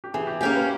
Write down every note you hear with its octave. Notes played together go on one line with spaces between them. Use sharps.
G4
E3 G#4
G4
A#3 C#4 G4 G#4
B4